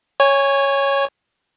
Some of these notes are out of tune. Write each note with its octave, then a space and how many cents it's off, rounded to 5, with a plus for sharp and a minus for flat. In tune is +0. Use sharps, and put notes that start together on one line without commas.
C#5 +0 G#5 -20